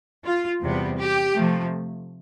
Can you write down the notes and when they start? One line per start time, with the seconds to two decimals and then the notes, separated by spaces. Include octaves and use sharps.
0.25 F4
0.61 E2 C3 G3 B3
0.99 G4
1.35 C3 F3 A3